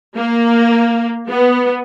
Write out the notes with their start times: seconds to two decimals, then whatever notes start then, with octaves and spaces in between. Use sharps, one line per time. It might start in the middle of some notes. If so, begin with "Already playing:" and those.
0.17 A#3
1.28 B3